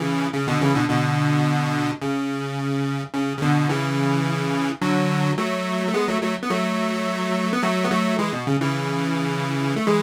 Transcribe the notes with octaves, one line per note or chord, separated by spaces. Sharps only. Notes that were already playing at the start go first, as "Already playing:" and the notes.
Already playing: C#3 E3
C#3
B2 D3
C#3 E3
B2 D3
B2 D3
C#3
C#3
C#3
B2 D3
C#3 E3
D3 F#3
F#3 A3
A3
G#3 B3
F#3 A3
F#3 A3
B3
F#3 A3
B3
F#3 A3
B3
F#3 A3
E3 G#3
B2
C#3
C#3 E3
A3
E3 G#3